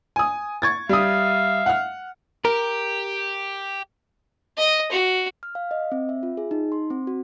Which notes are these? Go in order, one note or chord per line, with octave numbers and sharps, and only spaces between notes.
G#5 D#6
C#6 G#6 A6
G3 E5 F5 D#6
F#5 F6
G4 A#4
D#5
F#4
F6
F5
D#5
C4
E5
F4
G#4
D#4
C6
C4
F#4